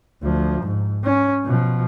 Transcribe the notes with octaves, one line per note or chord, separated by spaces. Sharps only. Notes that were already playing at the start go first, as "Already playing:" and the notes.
D2 F3
G#2
C#4
B2 F3